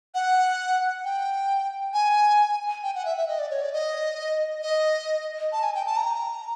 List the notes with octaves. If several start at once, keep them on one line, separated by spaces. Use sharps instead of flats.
F#5
G5
G#5
G5
F#5
E5
E5
D#5
D5
C#5
D5
D#5
D#5
A5
G#5
G5
A5
A#5